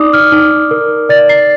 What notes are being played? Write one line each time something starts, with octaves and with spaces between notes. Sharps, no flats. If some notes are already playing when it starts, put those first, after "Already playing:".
Already playing: D#4 D5 D6 D#6
F6
D#4
A#4
D5 A6
C7